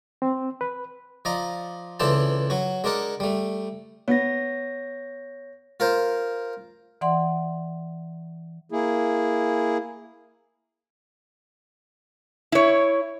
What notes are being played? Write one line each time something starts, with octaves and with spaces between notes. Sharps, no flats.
C4
B4
F3 D5 D#5 A#5
C#2 E3 D4 A4 C5 A5
F#3 F#4
G#3 D4 A#4 D5 F#5
G3 A3
B3 C#5 A#6
F4 A#4 C5
E3 D5 F#5 C6
A#3 E4 G#4
E4 C#5